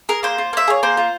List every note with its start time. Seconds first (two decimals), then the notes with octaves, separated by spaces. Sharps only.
0.09 G#4 A#4
0.23 A#3 C5
0.38 F4
0.53 A#3 E5
0.68 G#4 C#5
0.83 A#3 C5
0.97 F4